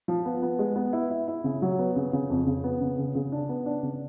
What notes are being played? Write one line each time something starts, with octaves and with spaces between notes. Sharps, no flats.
F3
B3
B3
G#3
B3
E4
E4
E4
C#3
F#3
B3
C#3
C#3
F2
C#3
B3
C#3
C#3
C#3
D4
B3
D4
C#3